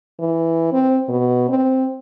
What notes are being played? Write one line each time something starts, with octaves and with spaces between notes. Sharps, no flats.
E3
C4
B2
C4